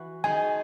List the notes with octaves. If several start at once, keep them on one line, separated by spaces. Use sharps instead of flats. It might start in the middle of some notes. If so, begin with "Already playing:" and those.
Already playing: E3 F#4
D#3 G#3 D#4 G#4 G#5